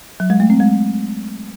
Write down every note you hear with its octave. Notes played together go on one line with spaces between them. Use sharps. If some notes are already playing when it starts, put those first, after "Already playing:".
F#3
G#3
A3
C4
G#3